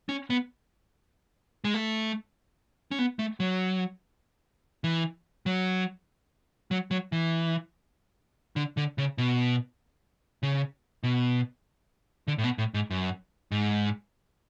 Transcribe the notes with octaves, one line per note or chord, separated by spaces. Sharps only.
C#4
B3
G#3
A3
C#4
B3
A3
F#3
E3
F#3
F#3
F#3
E3
D3
D3
C#3
B2
C#3
B2
D3
A2
B2
A2
G#2
F#2
G#2